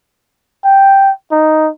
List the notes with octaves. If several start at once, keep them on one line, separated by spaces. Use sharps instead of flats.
G5
D#4